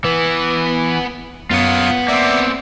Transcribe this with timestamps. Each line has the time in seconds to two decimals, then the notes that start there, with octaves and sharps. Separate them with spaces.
0.04 E3 B3 B4
1.51 F#2 B3 F4 C#5 F5 D#6
2.08 A#3 C4 D5 E5